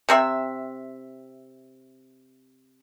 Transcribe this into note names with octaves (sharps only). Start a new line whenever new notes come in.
C3 C4 E5